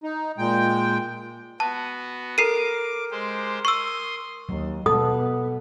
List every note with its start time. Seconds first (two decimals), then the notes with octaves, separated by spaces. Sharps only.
0.03 D#4
0.38 A#2 G#3 G5
1.60 B3 F#4 A5
2.38 A4 A#4 D6 C7 D#7
3.11 G#3 G4 C5
3.65 C6 C#6 D#6 E6
4.49 D#2 F#3
4.86 B2 B3 A4 D#6